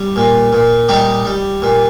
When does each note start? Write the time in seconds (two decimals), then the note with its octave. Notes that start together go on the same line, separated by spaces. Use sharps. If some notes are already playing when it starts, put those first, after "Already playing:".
Already playing: G3
0.16 A#2
0.53 A#2
0.89 G3 D#4 G4
1.25 G3
1.62 A#2